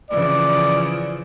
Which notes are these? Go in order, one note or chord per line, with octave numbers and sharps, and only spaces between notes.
C#3 E3 F3 D5